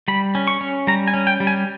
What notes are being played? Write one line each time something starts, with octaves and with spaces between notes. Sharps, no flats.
G3 B5
C#4
C#6
C#4
G3 A#5
G#5
C#4
G5
G3
G#5